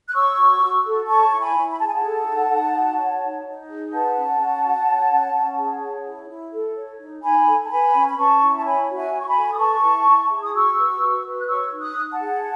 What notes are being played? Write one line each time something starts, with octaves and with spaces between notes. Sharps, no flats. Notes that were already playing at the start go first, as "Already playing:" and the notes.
F#6
C#5 C#6 E6
F#4
F#4
A4
C#5 A5 C#6
E4 C#6
G#5 B5
E4
B5
G#4 A5
G#5
F#5 A5
A4
D#4
D#4
F#4
C#5
D#4
D#4
G#4
B4 F#5 A5
C#4
C#4
F#4
C#5
C#4
C#4
G#4
C#5
E4
E4
A4
C#5
D#4
D#4 G#5 B5
A4
A5
B4 G#5 B5
C#4
B5
C#4 A5 C#6
E4
A5
C#5 G#5 B5
F#4
E5 G#5
F#4
C#6
G#5 B5
A4
D#6
B4 A5 C#6
E4
E4
G#4
D#6
F#4 C#6 E6
B4
F#4
B4
F#6
C#5 C#6 E6
D#4
D#6 F#6
D#4
F#5 A5
G#4